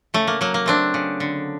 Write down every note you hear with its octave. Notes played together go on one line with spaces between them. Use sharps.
C#3 A3
A#3
F#3 A#3
A#3
A3 C4 D4
C#3
D3